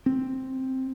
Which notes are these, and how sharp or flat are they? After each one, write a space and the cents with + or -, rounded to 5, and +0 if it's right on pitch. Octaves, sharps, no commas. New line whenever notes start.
C4 +5